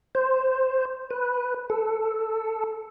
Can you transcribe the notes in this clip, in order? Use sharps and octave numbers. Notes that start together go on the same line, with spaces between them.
C5
B4
A4